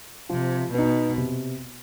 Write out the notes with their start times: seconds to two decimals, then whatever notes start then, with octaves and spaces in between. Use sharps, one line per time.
0.29 C3 F3
0.73 B2 B3 D#4
1.18 C3